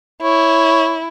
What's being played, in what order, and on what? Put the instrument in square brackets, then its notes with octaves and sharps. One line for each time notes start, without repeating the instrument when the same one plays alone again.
[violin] E4 [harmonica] C#5